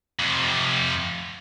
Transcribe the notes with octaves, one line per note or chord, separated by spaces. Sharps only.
F2 C3